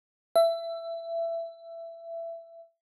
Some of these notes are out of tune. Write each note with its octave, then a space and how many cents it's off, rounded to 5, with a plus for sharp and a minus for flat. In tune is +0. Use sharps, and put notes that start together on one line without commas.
E5 +20